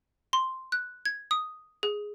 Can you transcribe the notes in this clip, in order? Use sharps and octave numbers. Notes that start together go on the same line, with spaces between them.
C6
F#6
G#6
D#6
G#4